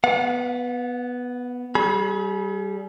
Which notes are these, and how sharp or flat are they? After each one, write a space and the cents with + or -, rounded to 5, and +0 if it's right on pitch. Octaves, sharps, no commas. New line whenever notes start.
B3 +0 F#5 -45
G3 -10 G#4 +35 B5 -30